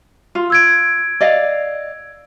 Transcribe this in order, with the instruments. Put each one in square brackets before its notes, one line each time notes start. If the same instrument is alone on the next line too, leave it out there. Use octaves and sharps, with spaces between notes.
[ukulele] F4
[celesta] E6 G#6 D7
[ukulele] D5 D#5 F5